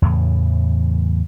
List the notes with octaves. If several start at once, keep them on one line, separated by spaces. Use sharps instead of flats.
E2 A2 C#3 E3